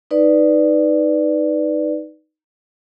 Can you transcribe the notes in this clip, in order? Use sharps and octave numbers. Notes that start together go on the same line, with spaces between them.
D#4 B4 D5